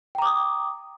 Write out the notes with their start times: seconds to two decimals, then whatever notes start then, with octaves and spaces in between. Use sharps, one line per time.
0.15 G5
0.18 A#5
0.22 D6
0.25 D#6